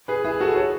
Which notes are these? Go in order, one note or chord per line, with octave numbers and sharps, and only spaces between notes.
G#4 B4
E4 G#4
F#4 A4
A4 C#5